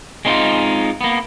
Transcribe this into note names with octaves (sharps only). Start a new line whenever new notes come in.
G#3 C4 D#4 F4
A#3 B3